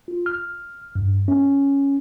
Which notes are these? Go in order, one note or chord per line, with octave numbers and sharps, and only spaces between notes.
F4
F6
G2
C#4